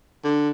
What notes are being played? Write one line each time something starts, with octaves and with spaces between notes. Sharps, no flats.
D3